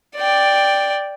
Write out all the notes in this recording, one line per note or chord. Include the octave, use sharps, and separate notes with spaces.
D5 G5